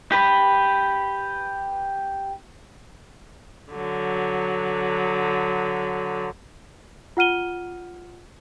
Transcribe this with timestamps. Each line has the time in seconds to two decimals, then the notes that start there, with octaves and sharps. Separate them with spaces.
0.12 G4 B4
3.73 D3 F#3
7.17 F4 F#5 F6 D#7 G7